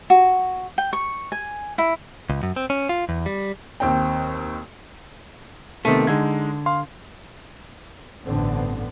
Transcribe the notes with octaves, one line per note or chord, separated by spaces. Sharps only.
F#4
G5
C#6
G#5
E4
C#2
F#2
C4
C#4
F4
E2
G3
D#2 C4 G5
C3 D#3 A3 B3 D#7
D3 G#3 D#4 G#6
F5 C6
A1 G2 D3 B3 C4